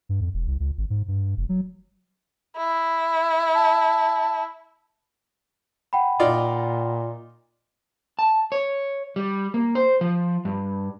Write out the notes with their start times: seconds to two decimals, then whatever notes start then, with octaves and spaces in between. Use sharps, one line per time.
0.09 G2
0.21 F2
0.34 E1
0.47 C2
0.60 C#2
0.78 G#1
0.90 G#2
1.08 G2
1.37 F1
1.49 F#3
2.57 E4
3.55 A5
5.93 F#5 G5 B5
6.19 A#2 D#4 F4 D5
8.19 A5
8.52 C#5
9.16 G3
9.54 A#3
9.75 C5
10.01 F3
10.45 G2